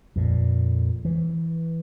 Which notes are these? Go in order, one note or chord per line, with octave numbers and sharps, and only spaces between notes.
F2 A#2
E3